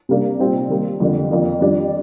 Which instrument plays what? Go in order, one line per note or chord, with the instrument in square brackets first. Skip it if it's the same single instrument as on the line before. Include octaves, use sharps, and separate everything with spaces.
[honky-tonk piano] C3 G3 A#3 D4
A#2 G3 C4 D#4
D#3 G3 A#3
F2 D3 G3 A#3
F2 D#3 A#3 D4
F2 D#3 G3 D4